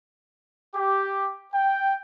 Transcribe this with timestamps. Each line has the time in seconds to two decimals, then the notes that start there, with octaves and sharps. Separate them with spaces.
0.74 G4
1.54 G5